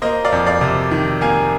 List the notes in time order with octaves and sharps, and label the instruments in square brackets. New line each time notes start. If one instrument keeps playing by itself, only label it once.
[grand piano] A#3 C5 D#5
D5 F5
F2
D5 F5
C3
D#3
A#3 F5 G#5